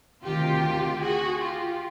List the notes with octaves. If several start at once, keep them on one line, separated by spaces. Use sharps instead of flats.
D2 C3 D#3 F4 G4
F#4 G#4
F4 G4